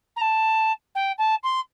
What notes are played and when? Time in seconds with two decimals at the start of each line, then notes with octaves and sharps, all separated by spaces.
0.16 A#5
0.21 A5
0.95 G5
1.18 A5
1.43 C6